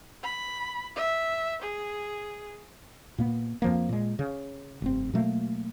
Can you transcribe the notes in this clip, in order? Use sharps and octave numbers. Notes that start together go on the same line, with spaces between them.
B5
E5
G#4
A#2 A#3 B3
F2 F3 A#3
A#2 G#3
C#3
F1 G2 C4
B2 F#3 A3 A#3